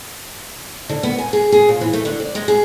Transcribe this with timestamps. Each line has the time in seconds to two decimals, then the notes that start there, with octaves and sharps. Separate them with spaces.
0.89 D3
1.03 B3
1.18 G#5
1.33 G#4
1.52 G#4
1.69 A#2
1.81 E3
1.93 A3
2.05 D3
2.20 D5
2.35 G#3
2.48 G#4